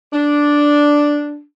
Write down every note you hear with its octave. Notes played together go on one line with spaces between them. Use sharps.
D4